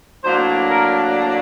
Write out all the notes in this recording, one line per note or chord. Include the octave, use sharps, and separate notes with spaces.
A2 F#3 A#3 D4 C5
A#4